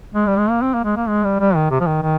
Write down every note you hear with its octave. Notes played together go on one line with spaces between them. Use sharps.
G#3
G3
G#3
A#3
C4
A#3
G#3
A#3
G#3
G3
G3
D#3
C3
F3
D#3
D#3